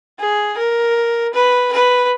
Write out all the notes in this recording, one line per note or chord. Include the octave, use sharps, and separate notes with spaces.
G#4
A#4
B4
B4